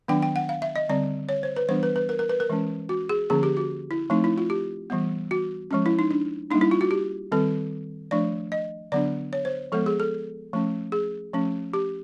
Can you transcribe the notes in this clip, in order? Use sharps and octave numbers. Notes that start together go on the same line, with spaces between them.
D#3 F#3 B3 D4 G5
G5
F#5
F5
E5
D#5
D3 G3 C4 D5
C#5
C5
B4
E3 G3 B3 D4 C5
B4
B4
A#4
A#4
B4
A#4
E3 G#3 C#4
F#4
G#4
D3 F3 A#3 C#4 G#4
G4
F#4
E4
F3 A3 C4 D#4
E4
F4
G4
E3 G3 B3
F#4
F3 G#3 C#4
E4
D#4
D4
G3 A#3 D4 D#4
E4
F4
F#4
G4
D#3 G3 C4 A4
F3 A3 D4 D5
D#5
D3 F#3 B3 D4 D5
C#5
C5
F3 G#3 B3 A4
G#4
A4
F3 A3 C#4
G#4
F3 A3 C#4
G4